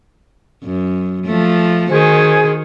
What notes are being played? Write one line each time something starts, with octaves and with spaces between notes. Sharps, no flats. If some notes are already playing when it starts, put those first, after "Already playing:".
F#2
F3 A3
D#3 F#4 G#4 C5 G#5